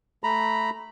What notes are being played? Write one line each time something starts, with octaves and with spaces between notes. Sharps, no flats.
A3 A#5 B5